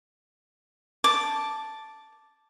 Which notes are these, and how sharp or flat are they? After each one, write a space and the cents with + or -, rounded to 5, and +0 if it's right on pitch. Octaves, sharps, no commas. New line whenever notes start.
A5 +0 D6 +0